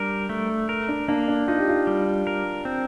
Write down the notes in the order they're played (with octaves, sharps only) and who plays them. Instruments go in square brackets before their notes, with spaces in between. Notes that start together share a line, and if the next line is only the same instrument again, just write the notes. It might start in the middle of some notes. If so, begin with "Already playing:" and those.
Already playing: [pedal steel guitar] G3 A#4 [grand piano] D4
[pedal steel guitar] A3
A#4
[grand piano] D4
[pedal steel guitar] A#3 [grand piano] D4
[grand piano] D4
[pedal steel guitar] D#4 [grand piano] F4
[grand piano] G4
F4
[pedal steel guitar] G3
A#4
C4